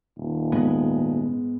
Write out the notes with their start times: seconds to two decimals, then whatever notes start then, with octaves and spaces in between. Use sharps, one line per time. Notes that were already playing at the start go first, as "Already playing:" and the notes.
0.17 D#1
0.52 G#2 G#3 B3